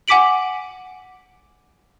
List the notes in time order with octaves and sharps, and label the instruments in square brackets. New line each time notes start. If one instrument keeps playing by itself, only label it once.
[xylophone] F#5 G#5 D6 B6 D7 F#7